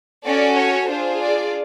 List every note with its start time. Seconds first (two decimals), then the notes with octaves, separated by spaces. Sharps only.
0.25 C#4 F#4 A4 D5
0.56 C#5
0.88 D4 F4 G#4 C5
1.21 D5